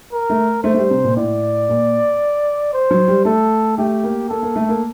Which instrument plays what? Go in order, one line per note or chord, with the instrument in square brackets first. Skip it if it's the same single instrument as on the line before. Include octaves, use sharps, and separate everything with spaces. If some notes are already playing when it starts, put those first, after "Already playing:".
[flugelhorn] A#4
[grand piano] A3
[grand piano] A3 [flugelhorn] C5
[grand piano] A3
G3
C3
A#2
[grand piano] A2 [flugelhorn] D5
[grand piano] A#2
[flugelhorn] C5
[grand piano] F#3
G3
[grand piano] A3 [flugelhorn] A4
[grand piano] A3 [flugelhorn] G4
[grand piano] A#3
[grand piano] A#3 [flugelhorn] A4
[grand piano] A#3
A3
A#3